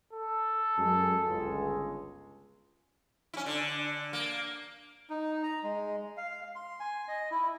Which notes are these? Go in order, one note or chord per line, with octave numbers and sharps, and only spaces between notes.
A4
F#2 G#3 G#4
G1 C#2 G#3
C#4 E4
D3
A#3
D#4
A#5
G#3
F5
C6
G#5
D#5
E4